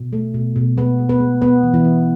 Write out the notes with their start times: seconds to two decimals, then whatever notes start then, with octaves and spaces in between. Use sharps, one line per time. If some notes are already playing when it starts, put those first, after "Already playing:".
Already playing: B2
0.13 A3
0.34 B2
0.56 B2
0.77 G#3 B3 B4
0.99 G#3
1.09 B3 B4
1.20 G#3
1.41 B3 B4
1.63 E3
1.74 E3 E4
1.85 E3